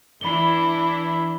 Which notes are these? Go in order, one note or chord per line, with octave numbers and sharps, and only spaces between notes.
E3 D4 E4 B5 G7